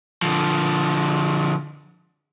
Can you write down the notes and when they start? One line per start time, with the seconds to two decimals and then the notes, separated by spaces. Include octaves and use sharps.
0.22 D3 F3